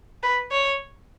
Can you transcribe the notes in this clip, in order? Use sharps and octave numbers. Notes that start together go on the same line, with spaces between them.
B4
C#5